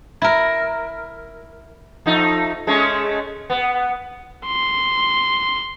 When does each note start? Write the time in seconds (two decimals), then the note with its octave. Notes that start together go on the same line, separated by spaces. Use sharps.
0.22 E4 A#4
2.06 F3 A3 D#4
2.67 G#3 A3 C#4
3.50 B3
4.46 C6